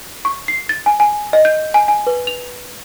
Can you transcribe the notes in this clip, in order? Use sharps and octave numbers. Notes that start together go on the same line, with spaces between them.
C#6
C7
A6
G#5
G#5
D#5
G6
G#5
G#5
B4
F7